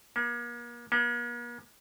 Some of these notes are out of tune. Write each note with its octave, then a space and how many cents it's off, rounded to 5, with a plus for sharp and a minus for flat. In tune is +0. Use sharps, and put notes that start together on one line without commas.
A#3 +40
A#3 +45